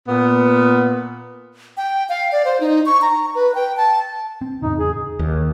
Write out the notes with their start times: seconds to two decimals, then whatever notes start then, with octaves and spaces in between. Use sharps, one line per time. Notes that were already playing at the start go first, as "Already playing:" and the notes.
0.08 A#2 B3
1.77 G5
2.09 F5
2.32 D5
2.45 C5
2.60 D#4
2.86 C#6
3.02 A#5
3.35 B4
3.55 G5
3.77 A5
4.41 C4
4.62 E2 G#2 C#3 D#4
4.78 G#4
5.19 D#2